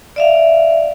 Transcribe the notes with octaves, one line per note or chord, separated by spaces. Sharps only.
D5 E5 F5